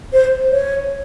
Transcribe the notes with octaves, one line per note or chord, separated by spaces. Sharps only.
C5
C#5